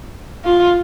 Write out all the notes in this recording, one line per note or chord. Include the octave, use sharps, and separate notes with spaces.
F4